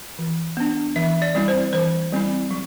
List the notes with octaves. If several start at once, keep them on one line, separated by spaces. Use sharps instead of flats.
E3
B3 D4
E3 E5
D5
G3 C4 E4
C5
E3 C5
G3 C4 E4
F#3